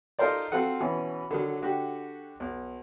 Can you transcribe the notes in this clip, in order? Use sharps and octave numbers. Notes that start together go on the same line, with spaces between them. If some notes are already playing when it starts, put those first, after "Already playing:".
D#4 F4 A4 A#4 C5 D5
C4 F4 F#4 A4 F#5
B2 E3 C#4
D3 D#3 F#3
D3 F#4 G4
B1